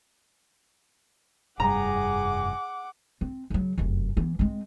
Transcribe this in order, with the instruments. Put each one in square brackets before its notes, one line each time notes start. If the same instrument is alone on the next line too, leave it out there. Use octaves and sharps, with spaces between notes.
[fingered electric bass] F1 G2 G3 [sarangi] G#4 [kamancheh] F#5 D6 [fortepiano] A#5
[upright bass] C4
C#3 F#3
F1 F#2
E3 B3
G#3 C4